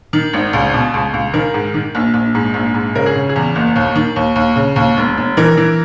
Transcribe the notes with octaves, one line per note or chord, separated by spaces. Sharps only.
D#3
G#1
C#2
B2
C#2
C#2
D#3 A#4
G#2
D#3
A#1
A#1
G#2
A#1
G#2
C#3 A#4
G#4
C#3
G#4
E2
F#1
D#2
D#3
D#2
D#2
C#3
D#2
E1
E1
E3 A#4
E3